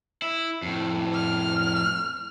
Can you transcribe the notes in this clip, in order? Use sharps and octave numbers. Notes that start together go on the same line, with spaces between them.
E4
F2 A2
F6